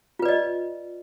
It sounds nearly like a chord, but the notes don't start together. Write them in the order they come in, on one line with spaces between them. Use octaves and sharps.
F4 B4 D5 D#5